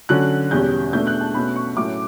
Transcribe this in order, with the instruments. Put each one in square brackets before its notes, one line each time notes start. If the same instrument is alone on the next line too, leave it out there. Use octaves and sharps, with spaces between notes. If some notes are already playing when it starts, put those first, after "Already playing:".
[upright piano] D3 F#3 C#4 F#6
E2 B2 G3 C#4 G6
B2 A3 D4 G6
F#6
A5
B2 A3 C#4 B5
C#6
A2 F#3 A3 C#4 D6